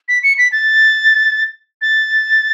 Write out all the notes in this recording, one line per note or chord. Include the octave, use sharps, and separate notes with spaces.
B6
C#7
B6
A6
A6